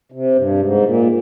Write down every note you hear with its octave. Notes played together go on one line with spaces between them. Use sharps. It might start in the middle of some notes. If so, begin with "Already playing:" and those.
C3
G2
G#2
A#2